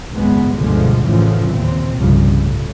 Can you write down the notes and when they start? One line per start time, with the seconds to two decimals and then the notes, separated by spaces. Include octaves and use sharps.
0.12 G#1 C#2 F#2 G#3 B3
0.57 D2 G2 B2 D3 F3 G#3
1.05 A1 F#2 A2 C#3 E3 F3
1.53 D#2 A#2 C4
1.99 C2 G2 C#3 F3
2.39 A2